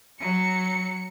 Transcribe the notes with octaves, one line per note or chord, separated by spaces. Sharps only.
F#3 C#7